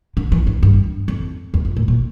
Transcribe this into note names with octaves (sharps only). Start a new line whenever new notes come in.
D3
E3
D3
G2
F2
E2
F2
A2
A#2